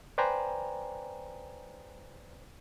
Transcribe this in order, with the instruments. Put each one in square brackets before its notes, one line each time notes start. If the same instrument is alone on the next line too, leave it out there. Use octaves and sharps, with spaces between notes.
[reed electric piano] B4 C5 D5 G5 G#5 A#5